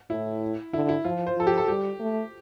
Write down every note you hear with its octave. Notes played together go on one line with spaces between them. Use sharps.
A2 E4
D3 E4
E4
F3 F4
C5
F3 A4
G4
A4
G3 G4
A3